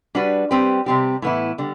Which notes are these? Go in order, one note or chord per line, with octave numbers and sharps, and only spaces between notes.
G3 D4 F#4 B4
G3 C4 G4 B4
C3 G3 C4 G4
A2 E3 B3 E4
D3 G3